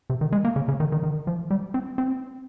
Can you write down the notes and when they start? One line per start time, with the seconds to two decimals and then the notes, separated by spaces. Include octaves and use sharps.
0.10 C3
0.21 D#3
0.32 G#3
0.45 A#3
0.56 C#3
0.68 C#3
0.80 D#3
0.92 D#3
1.03 D#3
1.27 F3
1.51 G3
1.74 C4
1.98 C4